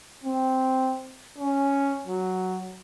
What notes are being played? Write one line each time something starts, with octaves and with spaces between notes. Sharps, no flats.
C4
C#4
F#3